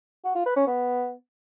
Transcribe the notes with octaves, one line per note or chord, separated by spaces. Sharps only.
F#4
F4
B4
C#4
B3